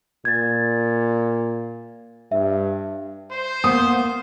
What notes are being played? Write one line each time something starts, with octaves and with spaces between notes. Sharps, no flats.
A#2 G#6 A6
G2 E5
C5
A#3 B3 D#6